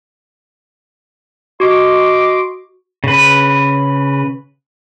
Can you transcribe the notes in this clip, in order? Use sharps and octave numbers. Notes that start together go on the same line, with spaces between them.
F#4 D#5 C6 D6
C#3 B4